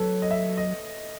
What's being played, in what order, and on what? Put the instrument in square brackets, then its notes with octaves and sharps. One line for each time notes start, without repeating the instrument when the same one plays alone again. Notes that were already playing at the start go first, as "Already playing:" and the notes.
Already playing: [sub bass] F#3 [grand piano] A4 B4 C#5
[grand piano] D#5
E5
D#5